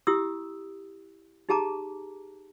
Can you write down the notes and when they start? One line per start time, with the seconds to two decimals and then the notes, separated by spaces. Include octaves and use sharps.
0.07 E4 G4 D#6 E6
1.49 D#4 G4 G#4 A5 A#5 D6